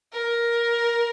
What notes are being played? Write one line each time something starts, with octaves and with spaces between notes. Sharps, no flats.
A#4